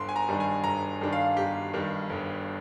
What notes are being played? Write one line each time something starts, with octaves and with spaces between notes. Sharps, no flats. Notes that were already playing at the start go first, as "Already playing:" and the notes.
Already playing: G1 C6
G#5
A#5
G2 D#3 G3 D4
G#5
G1 A#5
G2 D#3 G3 D4
F5
G1 G4
G2 D#3 G3 D4
G1